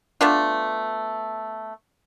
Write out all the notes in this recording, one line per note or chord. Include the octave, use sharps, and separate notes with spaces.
A3 B3 D4 F4